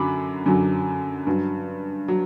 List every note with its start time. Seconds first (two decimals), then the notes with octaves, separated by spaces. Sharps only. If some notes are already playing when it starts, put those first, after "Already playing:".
Already playing: F#2 D3 F#3 B5 D6
0.46 F#2 D3 F#3
1.27 G2 F#3
2.08 F#3